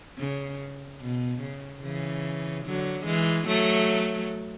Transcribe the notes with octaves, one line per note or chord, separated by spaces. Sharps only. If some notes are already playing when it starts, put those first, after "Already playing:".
C#3
B2
C#3
C#3 E3
D3 F#3
E3 G#3
F#3 A3